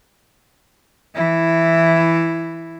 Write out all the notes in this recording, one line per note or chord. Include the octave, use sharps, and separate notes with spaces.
E3 E4